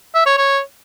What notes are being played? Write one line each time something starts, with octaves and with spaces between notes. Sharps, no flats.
E5
C#5
C#5